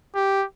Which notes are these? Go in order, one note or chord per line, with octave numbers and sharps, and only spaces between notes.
G4